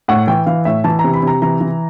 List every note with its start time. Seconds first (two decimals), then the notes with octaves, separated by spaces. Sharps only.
0.08 A2 F#5
0.27 E3 G5
0.46 E3 F5
0.65 A2 E5
0.84 E3 A5
0.99 A#5
1.04 C3
1.14 B5
1.23 C3 A#5
1.42 E3 A#5
1.61 E3